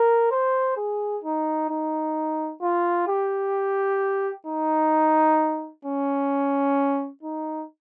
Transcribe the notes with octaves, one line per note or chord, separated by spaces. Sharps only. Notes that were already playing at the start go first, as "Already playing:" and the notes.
Already playing: A#4
C5
G#4
D#4
D#4
F4
G4
D#4
C#4
D#4